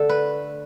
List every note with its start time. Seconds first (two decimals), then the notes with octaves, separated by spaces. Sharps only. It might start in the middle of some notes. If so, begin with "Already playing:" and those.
Already playing: D3 A3 D4 A4
0.09 B4